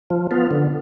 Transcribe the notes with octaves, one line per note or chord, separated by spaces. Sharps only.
F3
B3 F4
D3